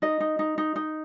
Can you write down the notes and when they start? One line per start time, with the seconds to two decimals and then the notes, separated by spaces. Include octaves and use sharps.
0.02 D#4 D#5
0.20 D#4
0.39 D#4
0.58 D#4
0.76 D#4